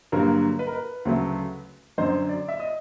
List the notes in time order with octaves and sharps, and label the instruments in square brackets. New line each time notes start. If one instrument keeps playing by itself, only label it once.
[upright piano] G2 D3 F#3 A#3 A#4
B4
A#4
B4
D2 C#3 F#3 A3
F#2 D3 F#3 C5
D5
E5
D#5